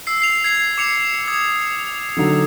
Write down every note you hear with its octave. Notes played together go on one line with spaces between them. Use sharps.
E6 C7
C7 F7
G#6 C7
D6 C#7 F7
D#6 G#6
D3 D#3 F#3